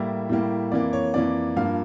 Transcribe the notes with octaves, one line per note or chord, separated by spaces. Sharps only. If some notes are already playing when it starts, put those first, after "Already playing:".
Already playing: A2 G3 A#3 E4 E5
A2 G3 A#3
F2 E3 A#3 D5
C#5
F2 E3 A#3 D5
G2 F3 A#3 F4 F5